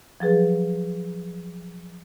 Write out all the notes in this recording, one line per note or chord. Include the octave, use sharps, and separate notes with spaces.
F3 F#3 G#4 B4